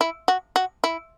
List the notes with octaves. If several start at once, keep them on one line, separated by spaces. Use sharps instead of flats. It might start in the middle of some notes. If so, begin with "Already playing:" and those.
E4
F#4
F#4
E4